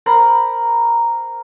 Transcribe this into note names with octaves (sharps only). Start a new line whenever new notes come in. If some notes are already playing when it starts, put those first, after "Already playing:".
A#4 C5 A#5 B5